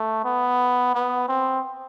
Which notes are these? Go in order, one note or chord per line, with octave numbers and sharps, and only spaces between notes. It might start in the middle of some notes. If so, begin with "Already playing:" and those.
Already playing: A3
B3
B3
C4